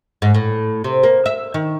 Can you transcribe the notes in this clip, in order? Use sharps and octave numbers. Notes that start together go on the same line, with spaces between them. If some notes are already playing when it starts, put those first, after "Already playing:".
G#2
A2
C3
A#3
E5
D#3